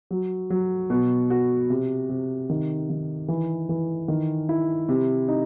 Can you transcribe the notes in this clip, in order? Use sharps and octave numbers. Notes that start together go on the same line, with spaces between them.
F#3
F#3
B2
F#4
C3
C3
D#3
D#3
E3
E3
D#3
E4
C3
D#4